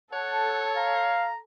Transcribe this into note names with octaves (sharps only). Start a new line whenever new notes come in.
A4 C#5 F#5
F5 A#5